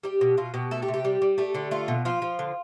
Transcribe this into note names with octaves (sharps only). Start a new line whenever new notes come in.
G3 G4
B2
B2 F4
B2 G4
A3 A4
G4
C3
G4
G3
G3
A3 G4
D3 G4
A3 F4
B2
F3 F4
F3
D3